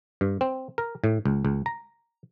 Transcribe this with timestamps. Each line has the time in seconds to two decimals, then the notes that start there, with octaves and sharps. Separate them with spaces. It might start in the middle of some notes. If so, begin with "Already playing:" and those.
0.21 G2
0.41 C4
0.78 A#4
1.04 A2
1.26 C#2
1.45 C#2
1.66 A#5